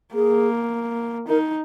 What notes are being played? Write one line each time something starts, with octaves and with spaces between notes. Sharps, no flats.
A#3 G#4
D#4 A#4